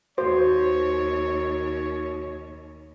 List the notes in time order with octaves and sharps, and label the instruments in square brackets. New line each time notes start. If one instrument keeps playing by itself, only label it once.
[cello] D#2 [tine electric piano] F#4 [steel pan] C5 [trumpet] C#5